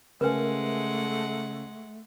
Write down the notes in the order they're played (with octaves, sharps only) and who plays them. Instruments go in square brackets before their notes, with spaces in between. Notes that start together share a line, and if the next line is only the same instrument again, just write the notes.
[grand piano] C#3 [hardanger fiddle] G#3 F#5 [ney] A3 [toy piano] A#4 B4 G#5